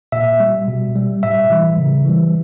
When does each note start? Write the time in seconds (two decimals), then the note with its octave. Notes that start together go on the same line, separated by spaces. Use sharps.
0.12 A#2 E5
0.40 G3
0.68 B2
0.96 G3
1.23 A2 E5
1.50 E3 G3
1.78 C#3
2.06 E3 G3